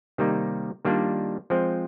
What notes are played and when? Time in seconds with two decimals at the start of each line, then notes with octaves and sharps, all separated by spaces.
0.18 C3 D#3 G3 A#3 D#4
0.85 D#3 G3 A#3 D4 F4
1.50 F3 G#3 C4